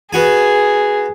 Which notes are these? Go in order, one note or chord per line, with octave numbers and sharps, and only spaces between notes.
B3 F#4 G#4 G#5